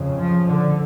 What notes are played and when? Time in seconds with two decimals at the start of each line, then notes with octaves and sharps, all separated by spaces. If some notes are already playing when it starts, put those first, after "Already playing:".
Already playing: F2 C#3
0.18 F3
0.48 D3